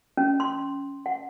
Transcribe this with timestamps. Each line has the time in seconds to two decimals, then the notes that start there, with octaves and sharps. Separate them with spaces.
0.17 C#4
0.40 C6
1.06 F#5